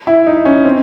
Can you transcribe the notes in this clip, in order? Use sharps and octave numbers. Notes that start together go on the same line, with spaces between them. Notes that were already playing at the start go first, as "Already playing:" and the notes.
E4
D#4
C#4
C4